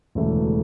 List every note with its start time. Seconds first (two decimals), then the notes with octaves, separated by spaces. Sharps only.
0.15 E1 D2 C#3 E3 A3